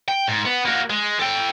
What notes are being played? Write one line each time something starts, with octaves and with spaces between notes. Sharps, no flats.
G5
G#2
B3
A#3 F#4
G#3
A4 G5